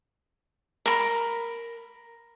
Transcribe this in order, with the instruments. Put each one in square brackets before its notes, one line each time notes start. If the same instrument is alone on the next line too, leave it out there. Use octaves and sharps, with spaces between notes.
[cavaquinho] A#4 B5